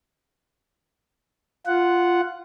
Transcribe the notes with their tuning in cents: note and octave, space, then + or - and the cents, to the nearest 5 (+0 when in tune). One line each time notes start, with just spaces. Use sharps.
F4 -5 F#5 +0